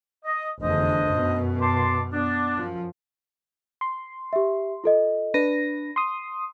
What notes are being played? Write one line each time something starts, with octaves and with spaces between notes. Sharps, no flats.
D#5
F1 E2 D3 D4 C5 D#5
F#2 B2
A5 C6 D6
B3 D4
F#2 F3
C6
G4 E5
F4 A4 D#5
D4 B4 A#6 D#7
C6 D#6